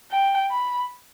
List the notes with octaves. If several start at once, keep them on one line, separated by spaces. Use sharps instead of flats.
G5
B5